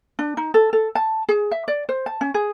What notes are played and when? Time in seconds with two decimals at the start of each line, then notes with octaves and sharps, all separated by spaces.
0.19 D4
0.37 D#4
0.54 A4
0.73 A4
0.95 A5
1.29 G#4
1.51 E5
1.68 D5
1.89 C5
2.06 A5
2.21 C#4
2.34 G#4